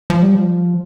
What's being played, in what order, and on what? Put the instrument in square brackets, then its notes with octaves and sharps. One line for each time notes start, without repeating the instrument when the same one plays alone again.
[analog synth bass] F3
G3
F3